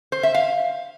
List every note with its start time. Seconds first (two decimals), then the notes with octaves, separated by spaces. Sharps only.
0.12 C5
0.23 E5
0.34 F5